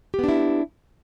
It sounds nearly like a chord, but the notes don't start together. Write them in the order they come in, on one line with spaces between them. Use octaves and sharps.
G4 B3 D4 E4